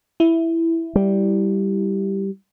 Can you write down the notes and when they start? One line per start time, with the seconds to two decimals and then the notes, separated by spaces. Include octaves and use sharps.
0.20 E4
0.95 G3